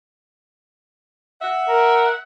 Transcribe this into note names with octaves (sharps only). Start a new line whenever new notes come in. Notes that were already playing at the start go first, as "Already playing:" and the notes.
E5 F#5
A#4